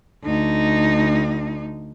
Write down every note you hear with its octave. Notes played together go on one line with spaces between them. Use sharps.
D2 D#4